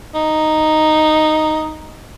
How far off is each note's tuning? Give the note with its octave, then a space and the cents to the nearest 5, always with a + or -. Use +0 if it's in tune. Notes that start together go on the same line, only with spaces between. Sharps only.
D#4 -5